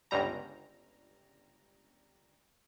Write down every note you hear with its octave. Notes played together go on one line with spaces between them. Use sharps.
G1 C#2 G3 A#5